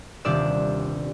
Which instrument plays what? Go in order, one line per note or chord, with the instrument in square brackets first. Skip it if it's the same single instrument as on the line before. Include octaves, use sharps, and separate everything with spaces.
[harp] D#1 C3 D4 G4 D5 E6